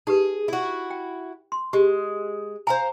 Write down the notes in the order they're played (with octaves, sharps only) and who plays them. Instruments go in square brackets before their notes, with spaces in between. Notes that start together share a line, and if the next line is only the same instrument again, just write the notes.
[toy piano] D#4 G4 B4 [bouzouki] G#4
[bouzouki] E4 F#4
[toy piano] G5
C6
[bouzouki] G#3 [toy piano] G4
[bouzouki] C5 F5 A#5 [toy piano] G#5